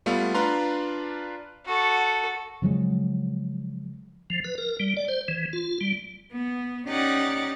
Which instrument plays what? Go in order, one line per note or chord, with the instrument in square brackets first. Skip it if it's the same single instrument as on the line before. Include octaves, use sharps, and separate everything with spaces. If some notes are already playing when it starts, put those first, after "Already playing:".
[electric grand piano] G3 A3 B3 F4
D4 F4 B4 F5 A#5 C6
[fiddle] F#4 A4
[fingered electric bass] C#3 F3 F#3 G#3
[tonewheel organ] F3
B4
A#4
G3
D5
C5
E3
F4
G3
[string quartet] B3
C#4 D#4 G4 D5 F#5 A6